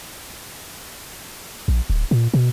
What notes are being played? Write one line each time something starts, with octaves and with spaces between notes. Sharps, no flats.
A#1
D1
A#2
B2